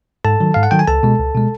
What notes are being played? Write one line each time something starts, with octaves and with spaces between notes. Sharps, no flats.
G#2 A4 A5
D#3 F#3
G#2 F5
F#5
D#3 F#3 G5
G#5
C#2 A4 A5
B2 G#3
C#2
B2 G#3